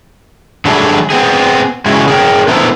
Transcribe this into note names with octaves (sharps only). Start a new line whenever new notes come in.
D3 F#3 G3 A3 G#4
B3 C4 G#4
C#3 G#3 E4 F#4 G#4
G#4 A#4 C#5 G5
D3 A3 B3 E4 A#4 C5